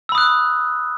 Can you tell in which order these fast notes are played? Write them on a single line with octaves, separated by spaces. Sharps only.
E6 B5 D#6 F#6